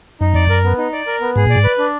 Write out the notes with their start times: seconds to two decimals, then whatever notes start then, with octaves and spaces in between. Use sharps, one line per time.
0.21 F#2 D#4
0.34 F2 D5
0.47 F#2 A#4
0.64 B3
0.78 D#4
0.93 D5
1.07 A#4
1.21 B3
1.36 G#2 G#4
1.47 A#2 D5
1.56 G#2
1.64 B4
1.78 D4